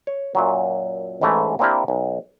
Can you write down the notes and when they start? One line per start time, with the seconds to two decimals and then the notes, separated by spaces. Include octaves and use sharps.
0.07 C#5
0.35 F#2 A#2 F#3
1.21 A1 G#2 E3 A3 G#5 A#5
1.59 A#3 C4 D4 E4 G4 A#4
1.88 B1